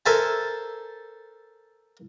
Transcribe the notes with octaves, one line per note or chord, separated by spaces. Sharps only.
A4 A#4 C5 E5 G#5 A5